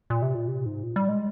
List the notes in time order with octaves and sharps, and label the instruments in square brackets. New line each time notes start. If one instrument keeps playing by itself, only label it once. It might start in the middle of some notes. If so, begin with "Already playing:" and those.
[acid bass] A#2
C3
A#2
C3
G#2
A#2
G3
G#3